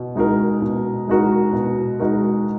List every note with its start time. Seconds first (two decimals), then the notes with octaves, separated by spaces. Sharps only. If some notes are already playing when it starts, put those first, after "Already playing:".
Already playing: B2
0.15 G#3 D#4 F#4 A#4
0.62 B2
1.08 G#3 D#4 F#4 A#4
1.53 B2
1.99 G#3 D#4 F#4 A#4